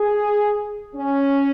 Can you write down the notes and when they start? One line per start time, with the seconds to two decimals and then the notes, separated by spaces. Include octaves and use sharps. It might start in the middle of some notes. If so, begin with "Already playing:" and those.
Already playing: G#4
0.95 C#4